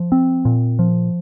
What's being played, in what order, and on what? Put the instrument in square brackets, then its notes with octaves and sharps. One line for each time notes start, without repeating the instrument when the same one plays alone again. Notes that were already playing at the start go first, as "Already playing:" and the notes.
Already playing: [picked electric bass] F3
C4
A#2
F3